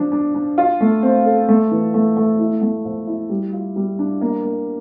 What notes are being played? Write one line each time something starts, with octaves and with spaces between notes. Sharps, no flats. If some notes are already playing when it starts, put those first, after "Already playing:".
Already playing: F3 D4
D4
D4
F4
A3
C4
A4
A3
E3
A3
A3
E4
A3
F3
E4
G3
F4
G3
D4
A#3
A#3